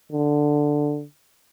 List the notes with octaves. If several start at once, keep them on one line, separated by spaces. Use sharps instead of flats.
D3